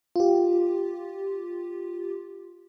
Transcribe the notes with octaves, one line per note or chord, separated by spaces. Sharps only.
F4 G4